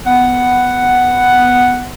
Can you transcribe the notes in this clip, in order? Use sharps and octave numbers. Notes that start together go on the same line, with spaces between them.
B3 F#5